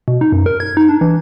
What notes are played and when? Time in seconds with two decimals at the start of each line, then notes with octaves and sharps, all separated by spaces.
0.08 B2
0.21 D#4
0.32 F#2
0.46 A#4
0.60 G#6
0.77 D#4
0.89 D4
1.01 E3